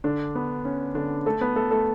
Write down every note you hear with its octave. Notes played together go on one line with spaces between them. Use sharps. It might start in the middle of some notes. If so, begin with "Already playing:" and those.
D3 D4
B3
C#4
D3 D4
A3 A4
B3 B4
A3 A4
A3 A4